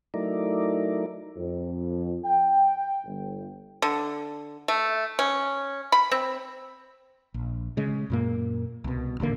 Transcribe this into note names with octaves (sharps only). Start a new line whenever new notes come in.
F#3 A3 D#4 E4 A#4 D5
F2
G5
G1
D3
A3
C#4
B5
C4
A#1
C#3 G#3
F#2 A#2 A#3
C2 B2
D#1 A1 D3 A#3